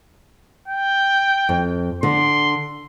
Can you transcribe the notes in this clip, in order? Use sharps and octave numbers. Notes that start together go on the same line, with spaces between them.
G5
F2
D3 C6